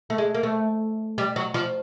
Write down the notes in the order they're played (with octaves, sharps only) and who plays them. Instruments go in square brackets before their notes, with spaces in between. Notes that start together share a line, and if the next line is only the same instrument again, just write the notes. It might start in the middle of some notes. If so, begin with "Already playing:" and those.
[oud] A3
G#3
A#3
A3
G3
F#3
F3